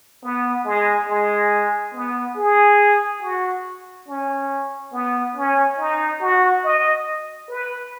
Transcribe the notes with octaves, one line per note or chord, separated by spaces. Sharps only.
B3
G#3
G#3
B3
G#4
F#4
C#4
B3
C#4
D#4
F#4
D#5
B4